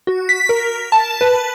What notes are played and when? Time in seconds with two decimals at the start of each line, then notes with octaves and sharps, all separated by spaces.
0.07 F#4
0.29 B6
0.49 A#4
0.92 A5
1.21 B4